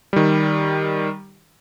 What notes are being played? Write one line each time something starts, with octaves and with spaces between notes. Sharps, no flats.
D#3 G3